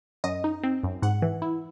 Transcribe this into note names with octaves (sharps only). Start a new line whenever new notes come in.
F#2 D#5
D#4
C4
F#2
G#2 F#5
E3
E4